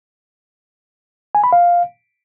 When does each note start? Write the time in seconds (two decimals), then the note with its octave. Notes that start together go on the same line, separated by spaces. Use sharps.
1.35 G#5
1.44 B5
1.53 F5